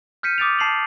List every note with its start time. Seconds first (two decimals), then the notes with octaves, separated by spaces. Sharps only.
0.23 F6 G6 B6 C#7 D#7
0.38 D6 D#6 G6 A6 D7 F7
0.59 A5 C7 F7 F#7